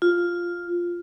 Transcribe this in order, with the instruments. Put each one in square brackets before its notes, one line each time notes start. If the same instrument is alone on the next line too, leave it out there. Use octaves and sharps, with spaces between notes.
[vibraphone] F4